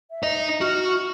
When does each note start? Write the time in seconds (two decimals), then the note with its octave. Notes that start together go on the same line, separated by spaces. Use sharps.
0.11 E5
0.23 D#4 D#5
0.61 F#4 F6